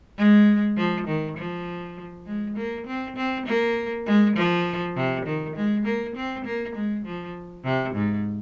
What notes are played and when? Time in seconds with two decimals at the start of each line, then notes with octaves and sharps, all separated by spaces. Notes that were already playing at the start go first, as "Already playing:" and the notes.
0.17 G#3
0.77 F3
1.07 D#3
1.37 F3
2.26 G#3
2.57 A#3
2.87 C4
3.16 C4
3.46 A#3
4.06 G#3
4.36 F3
4.96 C3
5.26 D#3
5.56 G#3
5.85 A#3
6.16 C4
6.45 A#3
6.75 G#3
7.05 F3
7.65 C3
7.94 G#2